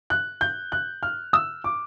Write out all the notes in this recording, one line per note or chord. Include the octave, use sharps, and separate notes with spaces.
F#6
G6
F#6
F6
E6
D6